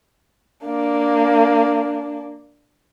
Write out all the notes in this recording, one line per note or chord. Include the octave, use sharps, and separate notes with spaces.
A#3 D4